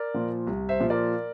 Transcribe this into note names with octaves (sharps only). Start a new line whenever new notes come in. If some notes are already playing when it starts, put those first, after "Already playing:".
Already playing: A#4 D5
A#2 F3
C2
C5 E5
A#2 F3
A#4 D5